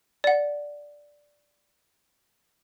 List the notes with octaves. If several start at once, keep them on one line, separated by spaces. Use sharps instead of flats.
D5 F#5